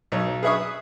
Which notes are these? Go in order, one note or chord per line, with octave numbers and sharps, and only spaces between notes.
B1 C#5
G#4 B4 E5 C#6 D#6